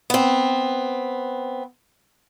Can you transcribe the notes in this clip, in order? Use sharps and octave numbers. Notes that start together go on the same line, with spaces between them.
B3 C4